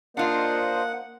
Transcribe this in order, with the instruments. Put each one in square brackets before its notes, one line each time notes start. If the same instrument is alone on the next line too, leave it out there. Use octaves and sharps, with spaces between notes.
[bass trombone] A#3 [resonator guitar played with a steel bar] D4 F4 [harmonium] C5 D#5 [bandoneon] F#5